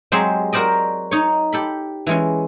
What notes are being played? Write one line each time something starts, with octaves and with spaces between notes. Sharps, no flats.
F#3 G#3 C4 G4 G#4 C5
F#4 A#4 C5 D5 D#5
D#4 C#5
G4 A4 B5
E3 G#3 C#4